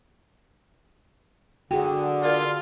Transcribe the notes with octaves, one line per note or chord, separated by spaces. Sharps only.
D3 F#4 G#4 G5
F4 A#4 D5